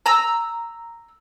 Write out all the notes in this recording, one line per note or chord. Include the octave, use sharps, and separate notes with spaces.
A#5 E6